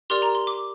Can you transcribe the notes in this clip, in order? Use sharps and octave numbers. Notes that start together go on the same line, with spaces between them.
G4 A#4 D5 C6
A#5
C6
D6